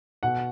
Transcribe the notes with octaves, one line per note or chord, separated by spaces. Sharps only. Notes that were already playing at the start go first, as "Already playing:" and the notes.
B2 F#5